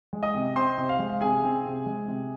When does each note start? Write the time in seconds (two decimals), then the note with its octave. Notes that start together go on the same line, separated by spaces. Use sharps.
0.13 G#3
0.23 D#5 D#6
0.34 C3
0.55 C4 C5 C6
0.78 C3
0.89 F5
0.99 G#3
1.09 F5
1.21 C3 G#4 G#5
1.44 C4
1.65 C3
1.86 G#3
2.08 C3